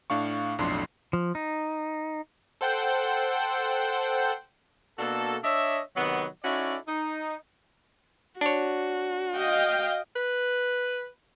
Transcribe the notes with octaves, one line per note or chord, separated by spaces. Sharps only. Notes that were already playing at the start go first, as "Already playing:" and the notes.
A2 D4 F5 C#6
B1 F2 A2 D4 C6 C7
F3
D#4
A4 C5 F#5 G5 G6
B2 A#3 D4 F#4 A4
D4 C#5 D#5 E5
C3 D#3 F#3 B3
C#4 D#4 E4 F#4 A4 D5
D#4
D4 F#4 C#5
D#5 F5 G5
B4